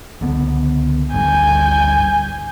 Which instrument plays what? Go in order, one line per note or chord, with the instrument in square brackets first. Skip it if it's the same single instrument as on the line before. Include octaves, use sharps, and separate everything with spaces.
[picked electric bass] C#2 D3 B3
[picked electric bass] G#1 D2 G2 [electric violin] G#5 G6